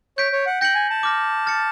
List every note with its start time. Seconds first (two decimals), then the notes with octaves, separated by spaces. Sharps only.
0.18 C#5 G6 B6 D7
0.32 C#5
0.46 F#5
0.61 G5 G6 A#6 C#7 F#7
0.75 G#5
0.90 A5
1.03 D6 F6 A#6
1.46 F6 A6 C#7